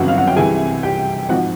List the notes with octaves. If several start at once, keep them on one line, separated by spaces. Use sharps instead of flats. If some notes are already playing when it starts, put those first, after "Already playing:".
Already playing: G1 F#2 C#3 E3 F#4 F#5
F5
F#5
G5
C2 C3 E3 G#4 G#5
G4 G5
G#1 G#2 F3 F#4 F#5